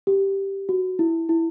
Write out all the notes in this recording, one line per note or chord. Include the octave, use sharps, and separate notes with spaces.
G4
F#4
E4
E4